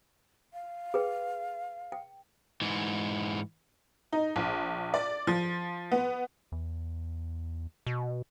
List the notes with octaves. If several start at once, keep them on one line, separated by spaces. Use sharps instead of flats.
F5
G#4 B4 G5
G5
G#2 E3
D#4
A#1
D5
F3
B3
E2
B2